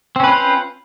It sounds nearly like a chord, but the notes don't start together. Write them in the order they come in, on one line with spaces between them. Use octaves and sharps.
C4 C#4 B4 F4 C5